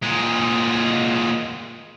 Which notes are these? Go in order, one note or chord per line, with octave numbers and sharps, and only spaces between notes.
A#2 G#3